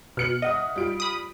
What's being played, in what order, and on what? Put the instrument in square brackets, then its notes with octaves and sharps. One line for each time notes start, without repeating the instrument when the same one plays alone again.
[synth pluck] B2 [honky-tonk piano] F6 C#7 F#7
[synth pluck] D#5 [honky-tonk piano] E5 F#5 D#6
[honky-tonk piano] G3 F4 D7
[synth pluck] B5 D#6